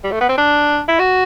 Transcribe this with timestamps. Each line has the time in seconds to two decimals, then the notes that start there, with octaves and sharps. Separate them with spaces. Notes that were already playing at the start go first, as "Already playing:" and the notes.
0.04 G3
0.11 A3
0.20 B3
0.29 C4
0.37 D4
0.88 E4
0.99 F#4